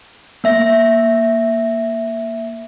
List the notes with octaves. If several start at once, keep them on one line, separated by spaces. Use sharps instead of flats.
A#3 E5 A#6